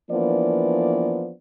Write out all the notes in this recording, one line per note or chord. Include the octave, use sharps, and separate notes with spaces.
E3 F3 A#3 B3 D4 D5